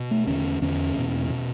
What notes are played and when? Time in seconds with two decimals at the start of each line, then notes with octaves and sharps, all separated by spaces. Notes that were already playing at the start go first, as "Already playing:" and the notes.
Already playing: B2
0.11 A3
0.27 E2 D3 C#4
0.61 E2 D3 C#4
0.96 E2 B2
1.30 B2